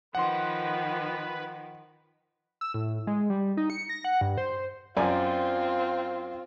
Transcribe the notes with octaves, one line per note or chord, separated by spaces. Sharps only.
D#3 F3 B4 F#5 C6
E6
A2
G#3
G3
D#4
C#7
A#6
F#5
G2
C5
F#2 C4 F4 D5 G#5